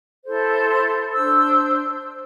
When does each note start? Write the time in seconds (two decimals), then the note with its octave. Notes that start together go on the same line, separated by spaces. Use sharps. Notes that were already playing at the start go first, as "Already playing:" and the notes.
0.24 E4 A4 C5
0.59 A5
0.68 C6
1.12 D4 C5 E6